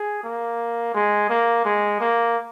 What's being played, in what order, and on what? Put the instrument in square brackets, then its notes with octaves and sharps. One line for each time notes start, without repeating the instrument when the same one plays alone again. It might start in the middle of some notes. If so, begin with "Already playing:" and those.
Already playing: [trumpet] G#4
A#3
G#3
A#3
G#3
A#3